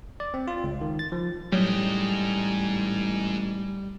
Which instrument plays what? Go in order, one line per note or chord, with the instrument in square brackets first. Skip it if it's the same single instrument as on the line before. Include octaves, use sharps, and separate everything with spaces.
[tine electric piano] D5
C4
F4
C#2
D#3
A6
F3
[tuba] A1 [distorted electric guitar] G#2 D#5 [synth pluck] F#3 [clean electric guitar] G3